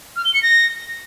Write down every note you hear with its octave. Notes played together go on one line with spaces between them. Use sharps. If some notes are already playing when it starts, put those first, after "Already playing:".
F6
G7
C#7
A#6